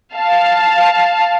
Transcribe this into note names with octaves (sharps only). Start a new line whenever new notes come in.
F5 A5